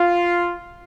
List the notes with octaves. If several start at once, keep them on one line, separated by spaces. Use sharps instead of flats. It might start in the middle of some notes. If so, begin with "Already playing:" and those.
Already playing: F4